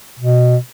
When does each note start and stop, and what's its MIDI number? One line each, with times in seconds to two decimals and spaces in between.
0.19 0.57 47